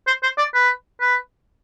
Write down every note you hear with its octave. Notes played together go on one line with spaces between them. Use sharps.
C5
C5
D5
B4
B4